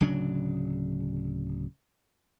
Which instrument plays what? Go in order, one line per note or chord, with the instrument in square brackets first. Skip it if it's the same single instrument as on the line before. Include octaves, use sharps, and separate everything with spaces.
[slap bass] D1 C#3 F#3 D4